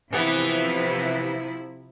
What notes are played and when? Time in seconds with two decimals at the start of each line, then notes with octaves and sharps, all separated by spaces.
0.13 C3 E3 F3 B3 E4